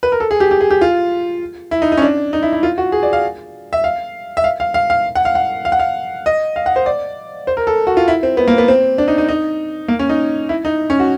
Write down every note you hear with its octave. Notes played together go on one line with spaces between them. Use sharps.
B4
A#4
A4
G#4
G4
G4
G#4
G4
F4
E4
D#4
D#4
C#4
D4
D#4
E4
E4
F4
F#4
G#4
D5
F5
E5
F5
E5
F5
F5
F5
F5
F#5
F5
F#5
F5
F#5
F5
D#5
F5
F#5
C5
D5
C5
A#4
A4
F#4
F4
E4
C4
B3
A#3
B3
C4
D4
D#4
D#4
D#4
A#3
C#4
D#4
E4
D#4
C#4
F#4